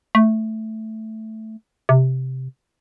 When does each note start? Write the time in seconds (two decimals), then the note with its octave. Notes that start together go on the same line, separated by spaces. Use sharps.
0.15 A3
1.89 C3